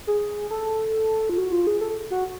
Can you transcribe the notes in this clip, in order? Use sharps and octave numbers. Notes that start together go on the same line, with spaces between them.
G#4
A4
F4
F#4
F4
G#4
A4
F#4